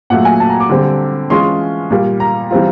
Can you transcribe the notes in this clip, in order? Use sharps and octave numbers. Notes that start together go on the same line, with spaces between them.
A#2 F#3 A3 F#5
G#5
A5
A#5
D6
D3 G3 C4
E3 G#3 C#4 F4 C6
A#2 G3 A#3
A#5
E3 G3 C4 F4